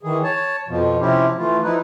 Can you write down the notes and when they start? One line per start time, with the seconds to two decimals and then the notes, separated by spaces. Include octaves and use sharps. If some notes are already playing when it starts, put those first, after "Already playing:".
0.03 D#3 E3 G#4
0.24 C#5 A5
0.68 F2 B2 F3
1.00 C3 F3 C4 C#4 E4 G4
1.38 E3 A3 F4
1.63 F3 D#4 E4 B4